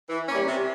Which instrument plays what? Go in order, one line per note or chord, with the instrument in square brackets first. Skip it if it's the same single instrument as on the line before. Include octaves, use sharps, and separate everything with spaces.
[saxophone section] E3
G3 A#3 C#4
C3